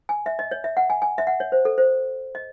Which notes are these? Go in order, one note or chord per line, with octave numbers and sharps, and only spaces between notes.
G#5
E5
D#5
C#5
E5
F#5
G#5
G#5
E5
F#5
C#5
C5
A4
C5
D#5